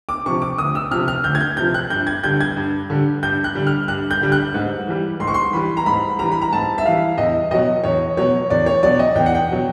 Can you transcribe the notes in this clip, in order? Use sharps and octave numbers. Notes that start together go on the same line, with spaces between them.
D6
C3 F3 C#6
D6
D2 D#6
E6
C3 F3 F6
F6
D2 G6
G#6
G6
C3 F3 G6
F#6
G2 G6
G#6
D3 G3 G6
G#6
G2
D3 G3
G2 G6
F#6
D3 G3
F6
G2 F#6
G6
D3 G3
F#6
G#2
E3 G3
G#2 C6
C#6
C6
E3 G3 B5
A#5
G#2 B5
E3 G3 A#5
B5
A#5
G#2 A5
E5
E3 G3 F5
E2 D#5
B2 F#3 D#5
E2 C#5
B2 F#3 C#5
E2 D5
C#5
B2 F#3 D5
D#5
E2 G5
F#5
G5
B2 F#3